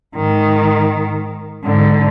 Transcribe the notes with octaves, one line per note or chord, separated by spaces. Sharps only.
G#2 D#3
G#2 D3